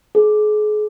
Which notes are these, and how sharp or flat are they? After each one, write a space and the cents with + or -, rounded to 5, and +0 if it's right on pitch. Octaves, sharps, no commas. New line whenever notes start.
G#4 +35